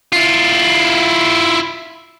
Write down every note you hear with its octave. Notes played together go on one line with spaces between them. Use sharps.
E4 F4